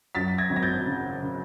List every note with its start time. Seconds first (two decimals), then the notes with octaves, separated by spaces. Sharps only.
0.15 F#2 A6 B6
0.38 G#6 A#6
0.50 G#1
0.56 A#6
0.63 G6 A6
0.86 C#3
1.22 C#3